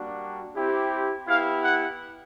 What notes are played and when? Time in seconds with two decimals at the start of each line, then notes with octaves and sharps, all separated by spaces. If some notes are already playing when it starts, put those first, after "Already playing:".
Already playing: G3 A#3 D4 F#4
0.55 C4 E4 G4
1.27 B3 E4 G4 F5
1.64 F#5